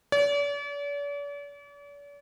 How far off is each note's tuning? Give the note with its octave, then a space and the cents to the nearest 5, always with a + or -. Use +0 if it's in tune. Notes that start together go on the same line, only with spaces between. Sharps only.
D5 -45